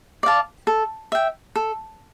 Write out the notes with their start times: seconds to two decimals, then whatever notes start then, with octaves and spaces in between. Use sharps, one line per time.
0.23 D5 F5 A5
0.67 A4
1.12 E5 G5
1.56 A4